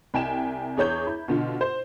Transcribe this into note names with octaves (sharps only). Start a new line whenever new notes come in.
C2 G5 G#5 E7
E2 G#4 C#5 G6
E4
B2 D3 F4
C5